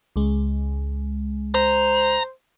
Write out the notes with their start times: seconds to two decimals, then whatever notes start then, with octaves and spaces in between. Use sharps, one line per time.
0.16 C#2 G#3
1.55 C5 A#5